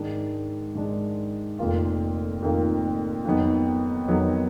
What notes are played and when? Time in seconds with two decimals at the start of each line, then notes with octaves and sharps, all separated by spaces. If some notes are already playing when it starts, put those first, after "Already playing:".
Already playing: G#2 D#3 G#3 D4
0.75 G#2 D#3 G#3 D4
1.59 F1 F2 D#3 A#3 F4
2.42 F1 F2 D#3 A#3 F4
3.25 F2 D#3 F#3 B3 D#4
4.08 F2 D#3 F#3 B3 D#4